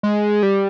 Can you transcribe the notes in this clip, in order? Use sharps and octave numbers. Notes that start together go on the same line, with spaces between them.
G#3
G3